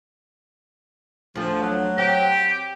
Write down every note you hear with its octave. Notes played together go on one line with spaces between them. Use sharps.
D2 D3 F3
F#3
C4 G4